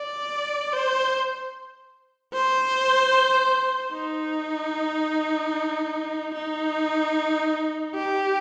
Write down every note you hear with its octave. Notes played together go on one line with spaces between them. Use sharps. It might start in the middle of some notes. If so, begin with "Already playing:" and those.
Already playing: D5
C5
C5
D#4
D#4
G4